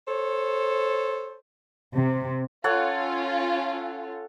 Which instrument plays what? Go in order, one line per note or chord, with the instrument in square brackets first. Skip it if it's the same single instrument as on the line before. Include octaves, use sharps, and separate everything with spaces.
[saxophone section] A4 C5 C#5
[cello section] C3
[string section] C#4 F4 [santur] A4 C#5 F#5